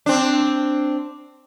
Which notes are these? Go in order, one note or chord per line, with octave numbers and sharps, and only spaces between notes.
C4 D4